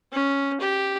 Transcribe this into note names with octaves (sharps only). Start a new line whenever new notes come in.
C#4
G4